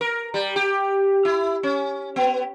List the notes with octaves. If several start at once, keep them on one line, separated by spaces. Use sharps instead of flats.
A#4
G3
G4
E4
C#4
B3